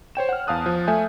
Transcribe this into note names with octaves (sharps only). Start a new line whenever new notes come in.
C5 C#5 G5 E7
F#5 F6
E2 F5 A5 D#6 F#6
F3
A3 E5 G#5 G6